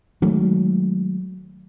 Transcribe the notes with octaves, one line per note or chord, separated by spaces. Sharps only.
D#3 F#3 G#3 A3